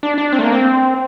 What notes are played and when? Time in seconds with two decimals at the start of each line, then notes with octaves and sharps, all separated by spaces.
0.03 D4
0.18 D4
0.32 C4
0.39 A3
0.43 A#3
0.52 C4